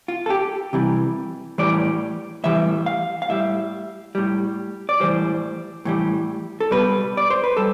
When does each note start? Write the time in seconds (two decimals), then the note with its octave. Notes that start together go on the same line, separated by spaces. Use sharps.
0.08 F4
0.26 A4
0.30 G4
0.73 C3 E3 G3
1.58 A2 E3 G3 D5
2.44 A2 E3 G3 E5
2.86 F5
3.22 F5
3.29 A2 G3 E5
4.15 A2 G3
4.89 D5
5.00 A2 E3 G3 C5
5.85 A2 E3 G3
6.61 A4
6.71 B2 G3 B4
7.17 D5
7.30 C5
7.44 B4
7.57 G3 A4